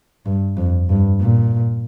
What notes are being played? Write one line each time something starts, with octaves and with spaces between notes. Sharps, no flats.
G2
F2
G2
A#2